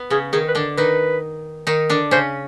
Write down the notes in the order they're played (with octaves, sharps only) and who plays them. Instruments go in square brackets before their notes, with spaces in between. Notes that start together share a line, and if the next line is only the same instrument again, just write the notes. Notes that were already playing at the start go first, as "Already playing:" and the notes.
Already playing: [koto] B3
[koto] C#3 C#4 [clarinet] G#4
[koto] D#3 D#4 [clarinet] G#4
[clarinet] B4
[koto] D3 D4
[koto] D#3 D#4 [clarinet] B4
[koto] D#3 D#4
D3 D4
[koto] C#3 C#4 [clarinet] C5